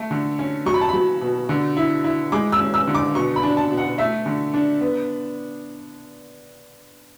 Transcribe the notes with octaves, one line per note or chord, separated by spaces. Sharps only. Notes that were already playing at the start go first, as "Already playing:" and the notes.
Already playing: A3
D3
C#4
F#3 C#6
B5
A5
F#3 B5
B2
D3
E4
E4
G#3 D6
E6
C#4
E6
D3
D6
B2 C#6
B5
D4
A5
B2
F#5
A3 E5
D3
D4
B3